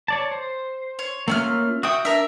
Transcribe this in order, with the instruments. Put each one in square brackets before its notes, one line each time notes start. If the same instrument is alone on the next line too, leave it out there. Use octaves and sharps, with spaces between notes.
[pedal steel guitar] C#5 D5 A5
C5
[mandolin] C#5
[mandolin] A3 G#5 F6 [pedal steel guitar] A#3 C#4 F4
[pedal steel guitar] F#4 G5 C#6 [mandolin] E5 D#6
[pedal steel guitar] D4 [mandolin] A#4 E5